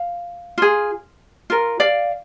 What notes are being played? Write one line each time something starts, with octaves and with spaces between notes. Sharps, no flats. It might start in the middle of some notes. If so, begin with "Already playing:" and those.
Already playing: F5
F4 G#4
F4 A#4
D5 F5